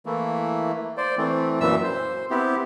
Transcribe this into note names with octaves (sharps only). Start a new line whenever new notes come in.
E3 A3 A#3 E4
C5 D5
E3 A3 C4
F#2 A#2 E3 E5 E6
C5
B3 C4 E4 G4